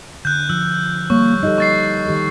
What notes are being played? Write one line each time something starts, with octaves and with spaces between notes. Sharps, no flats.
D3 F#6 G6
F3 E6
G3 A#3 C#5 C#6
D#4 G4 A4 D#5
A#3 C#6 A6 C7
D#3 G4 A4